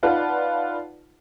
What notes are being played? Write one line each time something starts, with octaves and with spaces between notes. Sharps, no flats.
D#4 F4 B4 D5 F#5 A5